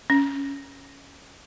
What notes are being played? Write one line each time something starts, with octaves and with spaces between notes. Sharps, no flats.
C#4